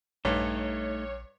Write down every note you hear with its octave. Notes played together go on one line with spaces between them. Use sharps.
A#1 G2 A3 D#4 C#5